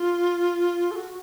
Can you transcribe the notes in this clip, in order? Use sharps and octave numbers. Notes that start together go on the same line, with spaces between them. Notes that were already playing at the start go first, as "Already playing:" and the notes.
Already playing: F4
A4
F#4